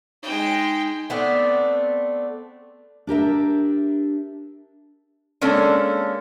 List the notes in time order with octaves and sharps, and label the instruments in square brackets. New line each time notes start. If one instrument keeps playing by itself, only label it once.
[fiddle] G#3 G5 [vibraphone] D#4
[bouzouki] A3 B3 C4 D4
[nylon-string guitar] D4 G4 A#4 E5
[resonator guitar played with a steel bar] G#3 A#3 C#4 D4 A4